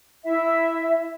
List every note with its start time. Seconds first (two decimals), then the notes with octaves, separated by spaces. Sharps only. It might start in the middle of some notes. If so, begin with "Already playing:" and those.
0.25 E4 E5